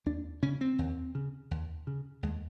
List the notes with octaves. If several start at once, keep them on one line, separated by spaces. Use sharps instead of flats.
D#2 D4
C#3 C#4
C4
D#2
C#3
D#2
C#3
D#2 G#3